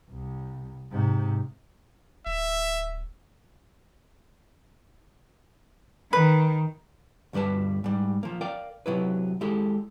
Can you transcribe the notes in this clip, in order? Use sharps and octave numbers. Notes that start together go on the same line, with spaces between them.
C2
G#2 C3
D1 E5
D#3 B4
D2 G2 G3 B4 A5
G#2 G3
F3 A#3
A#4 D5 F5 G5
C3 F#3 E4 B4
G#3 E4 G4 A4